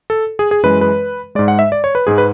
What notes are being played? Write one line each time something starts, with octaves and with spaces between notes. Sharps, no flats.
A4
G#4
G#4
F#2 E3 G#3 B4
B4
G#2 G#3 D5
F#5
E5
D5
C#5
B4
G#2 G#3 G#4
B4